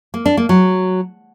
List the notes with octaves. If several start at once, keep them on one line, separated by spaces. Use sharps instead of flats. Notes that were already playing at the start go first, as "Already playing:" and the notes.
A#3
D4
A#3
F#3